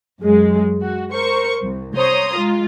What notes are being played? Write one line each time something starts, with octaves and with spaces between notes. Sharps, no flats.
F#2 G#3
F#4
A#4 C5 C#6
C2
C5 C#5 A#5 C6 D#6
G#3 F4